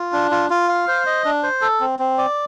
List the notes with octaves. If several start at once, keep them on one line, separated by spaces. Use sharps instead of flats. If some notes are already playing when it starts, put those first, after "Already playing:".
Already playing: F4
D4
F4
F4
F5
C5
D#5
D4
C5
A4
C4
C4
D5